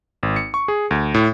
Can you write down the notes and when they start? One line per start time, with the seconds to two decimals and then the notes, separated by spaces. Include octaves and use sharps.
0.23 G#1
0.36 C#7
0.54 C#6
0.68 G#4
0.91 D2
1.14 A2